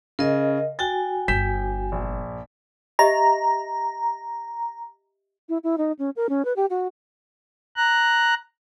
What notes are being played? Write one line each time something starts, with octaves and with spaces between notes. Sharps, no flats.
C#3 A#4 D#5
F#4 G5 G#5 A6
G1 G6 B6 E7
A#1
G4 D#5 E5 A#5
E4
E4
D#4
C#4
A#4
C#4
B4
G4
F#4
A#5 F#6